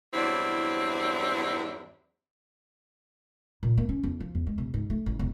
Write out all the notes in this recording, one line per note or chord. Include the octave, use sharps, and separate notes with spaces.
E2 G2 F#3 C4 E4 D5
A#2
A#3
C#4
E2
F3
E2
G#3
E1
G#2
A3
A1
E1